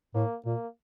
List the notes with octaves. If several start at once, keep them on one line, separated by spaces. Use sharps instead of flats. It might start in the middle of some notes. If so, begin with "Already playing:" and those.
A2 A#3
A#2 A#3